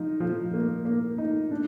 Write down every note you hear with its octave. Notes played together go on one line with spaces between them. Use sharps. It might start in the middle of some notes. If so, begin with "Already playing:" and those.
Already playing: F3 D#4
F3
A#3
A#3
D#4
D4